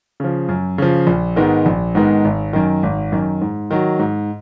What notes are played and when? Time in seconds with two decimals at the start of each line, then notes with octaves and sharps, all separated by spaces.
0.20 C#3 F3
0.49 F#2
0.78 C#3 F3
1.07 A#1
1.36 G#2 D#3 G#3 B3
1.66 A#1
1.95 G#2 D#3 G#3 B3
2.25 G#1
2.53 F#2 D#3
2.83 G#1
3.12 F#2 D#3
3.41 G#2
3.71 D#3 F#3
3.99 G#2